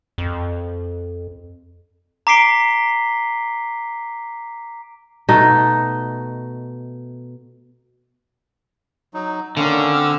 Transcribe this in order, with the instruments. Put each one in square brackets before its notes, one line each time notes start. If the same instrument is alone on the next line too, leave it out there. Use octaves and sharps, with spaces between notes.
[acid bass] F2
[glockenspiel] A#5 D6 B6 C7 D7 G7
[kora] B2 A3 D#4
[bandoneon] F#3 D#4
[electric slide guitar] D3 [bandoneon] D#3 A#3 C#4
[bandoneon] C4 E6 F6